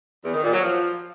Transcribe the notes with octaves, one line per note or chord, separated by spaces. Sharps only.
E2
D#3
A#2
F#3
F3